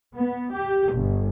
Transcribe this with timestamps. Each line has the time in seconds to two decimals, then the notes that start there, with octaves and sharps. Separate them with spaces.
0.14 B3
0.52 G4
0.93 G1